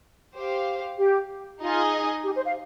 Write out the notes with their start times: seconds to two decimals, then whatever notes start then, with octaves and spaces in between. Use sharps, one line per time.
0.36 G4 C5 F5
0.98 G4
1.62 D#4 F4 G#4 D#5 G#5
2.25 G4
2.36 C5
2.46 F5